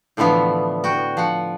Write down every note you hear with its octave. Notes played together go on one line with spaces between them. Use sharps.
A2 D3 E3 F3 B3
F#4 G5
F3 F#5